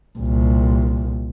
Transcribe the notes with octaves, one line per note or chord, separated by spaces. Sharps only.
C2 A#2